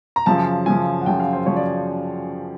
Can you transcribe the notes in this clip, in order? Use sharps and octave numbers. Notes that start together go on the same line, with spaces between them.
A#5
F#2 C#3 F3 A5
F#2 C#3 F3 G#5
F#5
F#2 C#3 F3 G5
F5
C5
F#2 C#3 F3 C#5
D5